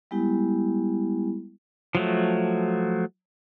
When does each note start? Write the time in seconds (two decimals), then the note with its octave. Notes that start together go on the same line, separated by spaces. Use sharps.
0.11 G3 G#3 B3 E4 G4
1.95 F3 F#3 A3